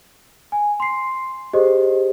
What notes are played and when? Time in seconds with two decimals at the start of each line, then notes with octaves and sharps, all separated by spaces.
0.52 G#5
0.80 C6 C7
1.53 G4 G#4 C5 D#5